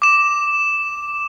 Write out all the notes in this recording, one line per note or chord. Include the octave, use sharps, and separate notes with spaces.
D6 E7